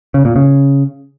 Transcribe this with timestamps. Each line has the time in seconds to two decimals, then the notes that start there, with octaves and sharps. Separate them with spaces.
0.14 C#3
0.25 A#2
0.36 C#3